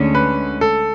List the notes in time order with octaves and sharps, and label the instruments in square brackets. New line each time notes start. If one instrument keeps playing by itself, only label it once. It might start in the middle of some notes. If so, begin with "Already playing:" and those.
Already playing: [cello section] D2 D3 G#3 C#4
[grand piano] B4
A4